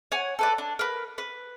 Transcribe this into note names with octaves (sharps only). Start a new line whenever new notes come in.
C#5 F#5 G#5
A4 B4 D5
D4
A#4 B4
B4